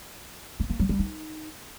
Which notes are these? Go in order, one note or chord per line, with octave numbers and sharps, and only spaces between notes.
A3
A#3
F#3
G3
D#4